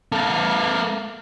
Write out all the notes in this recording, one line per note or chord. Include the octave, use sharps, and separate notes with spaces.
A#3 A4